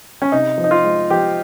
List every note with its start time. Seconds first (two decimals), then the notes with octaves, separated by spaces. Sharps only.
0.22 C#4
0.32 C3 D#4
0.58 F3
0.64 D#4
0.71 F4
0.84 G#3
1.10 F3 G4